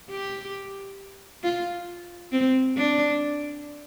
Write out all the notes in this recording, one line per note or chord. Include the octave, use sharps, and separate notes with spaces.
G4
F4
C4
D4